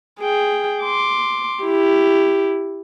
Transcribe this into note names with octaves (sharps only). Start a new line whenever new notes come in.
G#4 G5
C6 D6
E4 G4